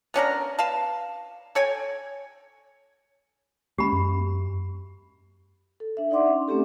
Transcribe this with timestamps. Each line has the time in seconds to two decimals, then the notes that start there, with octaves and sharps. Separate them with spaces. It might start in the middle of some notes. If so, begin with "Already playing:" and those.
0.14 B3 C#4 D4 A#4
0.59 B4 F5 A5
1.55 A4 C#5 G5 G#5
3.78 G#3 A#3 C#4 G4 B5
3.92 F#2
5.80 A4
5.97 D4 E5
6.10 D#4 D5 E5 F#5 C6 D6
6.26 C#4 D6
6.48 A3 C4 C#4 G4 A4